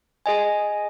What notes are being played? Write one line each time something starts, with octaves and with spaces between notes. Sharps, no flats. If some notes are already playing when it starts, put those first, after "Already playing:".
G#4 D#5 G#5